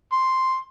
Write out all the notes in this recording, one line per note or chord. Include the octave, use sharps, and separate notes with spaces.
C6